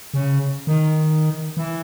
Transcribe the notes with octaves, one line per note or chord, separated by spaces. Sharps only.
C#3
D#3
E3